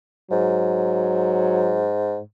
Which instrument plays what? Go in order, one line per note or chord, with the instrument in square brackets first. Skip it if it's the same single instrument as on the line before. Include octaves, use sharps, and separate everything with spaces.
[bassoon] G#2 [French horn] F#3